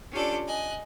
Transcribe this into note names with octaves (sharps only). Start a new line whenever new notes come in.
C#4 D4 F4 G4 A4 D5
D#5 G#5 F#6